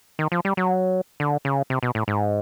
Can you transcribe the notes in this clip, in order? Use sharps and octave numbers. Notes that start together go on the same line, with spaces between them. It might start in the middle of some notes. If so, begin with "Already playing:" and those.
D#3
F3
G3
F#3
D3
C#3
C3
B2
A2
G#2